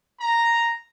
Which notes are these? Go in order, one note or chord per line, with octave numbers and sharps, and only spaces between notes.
A#5